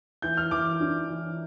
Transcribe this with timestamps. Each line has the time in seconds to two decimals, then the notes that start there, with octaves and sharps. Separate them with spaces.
0.22 E3 G6
0.37 F6
0.51 E3 D6
0.80 D4
1.10 E3